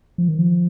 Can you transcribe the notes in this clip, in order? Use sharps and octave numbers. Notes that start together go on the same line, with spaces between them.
F3
D#3
F3